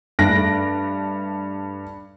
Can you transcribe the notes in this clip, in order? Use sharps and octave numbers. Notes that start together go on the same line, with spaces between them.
G2 A3 F#6 A#6 D7